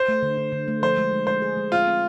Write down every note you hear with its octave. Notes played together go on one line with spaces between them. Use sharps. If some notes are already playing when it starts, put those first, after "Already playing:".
Already playing: C5
A3
D3
D3
D3
A3
F3 C5
G#3
G#3
G#3 C5
G#4
G#3
C4 F4
C4